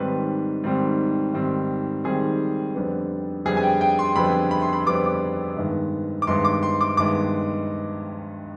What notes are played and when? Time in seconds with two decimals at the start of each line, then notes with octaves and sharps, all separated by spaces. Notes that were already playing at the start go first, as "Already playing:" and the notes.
Already playing: G#2 D#3 G3 C4 B4
0.64 G#2 D#3 G3 C4
1.34 G#2 D#3 G3 C4
2.04 G#2 D#3 G3 C4 G#4
2.75 F2 D3 G3 B3
3.45 F2 D3 G3 B3 G#4
3.57 G#5
3.63 G5
3.81 G5
3.99 C6
4.16 F2 D3 G3 B3 B5
4.51 B5
4.62 C6
4.73 B5
4.87 F2 D3 G3 B3 D6
5.06 D6
5.57 G2 D#3 G#3 B3
6.22 D6
6.27 G2 D#3 G#3 B3 C6
6.45 D6
6.63 C6
6.81 D6
6.97 G2 D#3 G#3 B3 D6